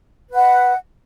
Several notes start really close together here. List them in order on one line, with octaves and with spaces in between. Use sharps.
B4 F#5 D#5